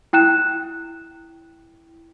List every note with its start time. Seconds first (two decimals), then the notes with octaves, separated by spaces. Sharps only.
0.13 E4 G5 F#6 E7